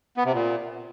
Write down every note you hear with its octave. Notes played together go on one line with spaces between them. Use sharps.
B3
C3
A#2